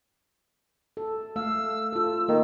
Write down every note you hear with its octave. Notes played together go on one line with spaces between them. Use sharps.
A4
A3 F5 E6
F4 A4
D#3 A#3